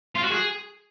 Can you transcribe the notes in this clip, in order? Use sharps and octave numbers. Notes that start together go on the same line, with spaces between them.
F4
F#4
G#4